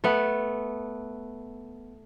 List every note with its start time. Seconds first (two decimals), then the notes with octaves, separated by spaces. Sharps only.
0.04 A3 B3